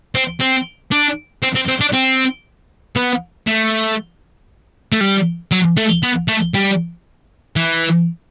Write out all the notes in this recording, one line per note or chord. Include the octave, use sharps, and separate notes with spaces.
C4
C4
D4
C4
C4
C4
D4
C4
B3
A3
A3
G3
F#3
A3
B3
A3
G3
E3